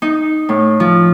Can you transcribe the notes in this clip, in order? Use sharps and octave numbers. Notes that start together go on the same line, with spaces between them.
D#4
A2
F3